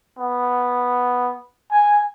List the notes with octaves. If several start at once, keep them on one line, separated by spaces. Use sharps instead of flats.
B3
G#5